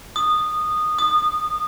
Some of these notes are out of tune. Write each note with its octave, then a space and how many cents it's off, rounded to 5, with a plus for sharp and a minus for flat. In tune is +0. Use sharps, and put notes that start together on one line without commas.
D#6 -15
D#6 -30